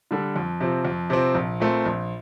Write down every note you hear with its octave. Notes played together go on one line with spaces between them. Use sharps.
D3 G3 D4 A4
F2
C3 F3 C4
F2
C3 F3 C4
A#1
A#2 A3 C4
A#1